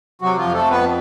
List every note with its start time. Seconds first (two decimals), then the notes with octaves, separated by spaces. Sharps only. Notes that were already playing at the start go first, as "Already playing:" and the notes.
0.21 C3 F#3 F#4
0.38 F3 F4
0.44 F2
0.54 A3 A4
0.65 F2
0.70 B3 B4